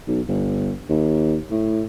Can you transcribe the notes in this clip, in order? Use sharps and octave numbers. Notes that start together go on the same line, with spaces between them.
B1
G1
D#2
A2